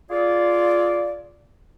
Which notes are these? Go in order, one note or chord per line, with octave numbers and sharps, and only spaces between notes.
F4 G#4 D5